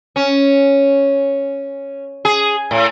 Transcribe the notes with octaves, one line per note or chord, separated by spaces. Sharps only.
C#4
G#4
A2